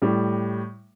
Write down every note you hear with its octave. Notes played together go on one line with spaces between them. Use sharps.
A2 G3